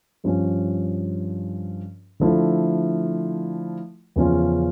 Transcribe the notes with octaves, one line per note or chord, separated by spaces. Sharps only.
G2 F3 C#4
D3 F3 A3 E4
E2 C#3 F3 C#4 F4